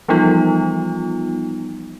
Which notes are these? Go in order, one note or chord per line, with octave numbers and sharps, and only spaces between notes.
E3 F3 G3 B3 D#4 F4